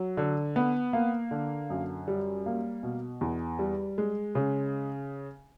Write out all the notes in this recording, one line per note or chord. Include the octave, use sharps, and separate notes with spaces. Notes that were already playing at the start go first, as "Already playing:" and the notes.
Already playing: F#3
D3
B3
A#3
D3
F#2
G3
A#3
B2
E2
G3
G#3
C#3